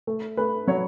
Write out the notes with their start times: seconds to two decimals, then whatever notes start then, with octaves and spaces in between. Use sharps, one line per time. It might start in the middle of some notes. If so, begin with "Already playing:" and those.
0.07 A3
0.37 A3 B4
0.67 F#3 C#5